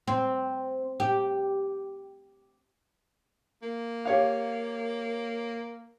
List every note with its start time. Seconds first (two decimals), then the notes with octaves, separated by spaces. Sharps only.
0.07 C4
1.00 G4
3.63 A#3
4.05 G4 C#5 F5